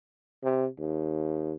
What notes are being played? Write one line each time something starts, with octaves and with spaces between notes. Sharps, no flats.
C3
D#2